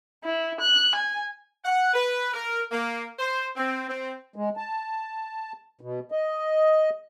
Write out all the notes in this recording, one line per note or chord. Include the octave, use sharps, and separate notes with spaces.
E4
F#6
G#5
F#5
B4
A#4
A#3
C5
C4
C4
G#3
A5
B2
D#5